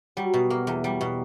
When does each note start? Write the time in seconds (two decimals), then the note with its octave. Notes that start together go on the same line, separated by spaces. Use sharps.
0.17 F#3 G3
0.34 B2
0.50 A#3
0.67 E2
0.84 G3
1.01 B2